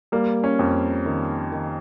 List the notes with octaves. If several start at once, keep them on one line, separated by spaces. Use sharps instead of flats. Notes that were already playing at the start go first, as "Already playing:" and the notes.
G3 A#3
C#4
F2
D#3
D#3